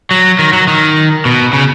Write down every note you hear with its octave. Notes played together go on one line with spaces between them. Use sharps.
F#3
D#3
F#3
D#3
B2
C#3